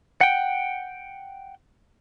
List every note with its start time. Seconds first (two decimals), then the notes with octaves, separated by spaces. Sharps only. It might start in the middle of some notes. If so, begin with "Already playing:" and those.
0.21 F#5 G5